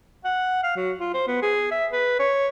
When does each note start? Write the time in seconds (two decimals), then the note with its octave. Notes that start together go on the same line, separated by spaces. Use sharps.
0.24 F#5
0.63 F5
0.76 F#3
1.00 F4
1.14 C5
1.27 B3
1.42 G#4
1.71 E5
1.92 B4
2.19 C#5